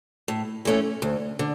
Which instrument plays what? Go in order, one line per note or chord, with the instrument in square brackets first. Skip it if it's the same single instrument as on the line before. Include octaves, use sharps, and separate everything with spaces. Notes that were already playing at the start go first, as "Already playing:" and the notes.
[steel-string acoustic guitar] A2
E3 A3 C#4
D2
D3